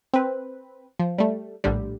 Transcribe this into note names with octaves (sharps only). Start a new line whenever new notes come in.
C4 B4
F3
G3 A3
A#1 A2 D3 G3